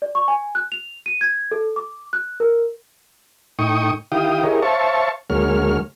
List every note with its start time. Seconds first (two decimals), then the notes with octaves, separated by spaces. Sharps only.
0.02 D5
0.15 C#6
0.28 G#5
0.55 F#6
0.72 F7
1.06 D#7
1.21 G#6
1.52 A4
1.76 D6
2.13 F#6
2.40 A#4
3.59 A2 D#4 G5 C#6 D#6
4.12 D#3 E4 G4 F5 G5 D#6
4.43 E4 G4 G#4 A#4 C#5 D#5
4.63 C5 C#5 E5 F5 A5 C#6
5.30 D2 F#3 G#3 A#3 C#5 F6